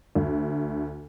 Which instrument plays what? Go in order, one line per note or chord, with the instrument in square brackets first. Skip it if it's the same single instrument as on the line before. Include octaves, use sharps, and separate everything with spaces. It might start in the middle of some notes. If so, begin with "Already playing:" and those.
[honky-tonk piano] D2